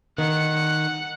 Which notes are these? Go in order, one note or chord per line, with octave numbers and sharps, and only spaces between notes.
D#3 F#5 C#7